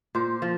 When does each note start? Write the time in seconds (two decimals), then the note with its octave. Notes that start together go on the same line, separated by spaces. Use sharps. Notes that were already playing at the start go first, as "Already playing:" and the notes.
0.15 A#2 C5
0.42 F3